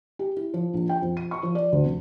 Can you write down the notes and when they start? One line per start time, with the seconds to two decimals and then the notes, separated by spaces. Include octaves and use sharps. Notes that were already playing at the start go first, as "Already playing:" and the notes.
0.19 G4
0.37 E4
0.54 F3
0.74 A#1
0.89 G5
1.02 F2
1.17 D#7
1.31 C#6
1.43 F3
1.55 D5
1.72 D2
1.85 F1